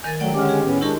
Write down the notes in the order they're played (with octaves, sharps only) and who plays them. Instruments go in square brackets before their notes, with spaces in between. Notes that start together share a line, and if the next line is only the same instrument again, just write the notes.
[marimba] D#3 A#4 A6 [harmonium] G#5
[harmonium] F#3 [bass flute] A3 [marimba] D5 F#5 G5
[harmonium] D3 G#3 C#4 [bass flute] G4 [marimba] D6 F6
[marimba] G#4
[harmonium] A2 B3 C#4
[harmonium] G#3 C#5 [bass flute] D4 [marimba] E4 G4 A#4